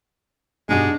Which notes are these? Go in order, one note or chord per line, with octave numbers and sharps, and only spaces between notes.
G2 B2 G#3 D4 D#4